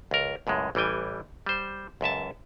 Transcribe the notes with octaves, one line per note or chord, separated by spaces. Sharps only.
C#2 A#4
C#2 F#2 A2 G#3
A1 E3 G3 G5 G#5
G3 C5
C#2 F#2 E5 A5